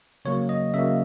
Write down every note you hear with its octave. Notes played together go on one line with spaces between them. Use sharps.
C#3 F#3 A#3 C#5
D#5
C#3 F#3 A#3 E5